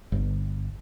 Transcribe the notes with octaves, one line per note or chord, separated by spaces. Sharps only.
G1